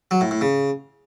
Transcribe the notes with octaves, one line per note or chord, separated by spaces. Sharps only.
F#3
A2
A2
C#3